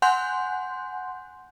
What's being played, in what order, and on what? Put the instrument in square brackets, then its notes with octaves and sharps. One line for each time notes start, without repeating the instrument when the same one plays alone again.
[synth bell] F#5 G#5 C6 F#6 G6